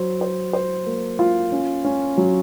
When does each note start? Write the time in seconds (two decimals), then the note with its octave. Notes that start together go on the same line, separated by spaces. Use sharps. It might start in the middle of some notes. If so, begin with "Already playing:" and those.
Already playing: F#3 C5
0.21 C5
0.53 C5
0.86 A#3
1.19 F4
1.52 C#4
1.85 C#4
2.17 F#3